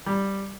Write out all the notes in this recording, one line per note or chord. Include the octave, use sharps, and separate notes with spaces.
G3